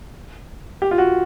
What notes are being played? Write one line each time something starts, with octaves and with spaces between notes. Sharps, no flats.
G4
F4
F#4